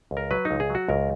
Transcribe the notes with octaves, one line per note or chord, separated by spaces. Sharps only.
C#2
A#4
F#3 B4
D#4
C#2
G#4
F#3
F#4
C#2 A#4